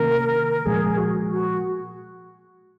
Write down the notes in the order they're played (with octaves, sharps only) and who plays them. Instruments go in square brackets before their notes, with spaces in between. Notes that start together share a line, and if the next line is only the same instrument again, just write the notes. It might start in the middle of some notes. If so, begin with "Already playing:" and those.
Already playing: [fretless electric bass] C3 D#3 A#3 C#4 [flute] A#4
[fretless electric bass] A#2 F3 G#3 [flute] G#4
[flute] F#4
F#4